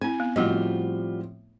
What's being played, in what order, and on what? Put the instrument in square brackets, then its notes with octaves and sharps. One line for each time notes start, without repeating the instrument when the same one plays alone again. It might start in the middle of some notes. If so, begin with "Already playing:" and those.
[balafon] C4 E4 [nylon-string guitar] G#5
[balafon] B3
[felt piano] A2 F3 C4 [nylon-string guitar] G3 F4 F#4 [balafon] A3 D#5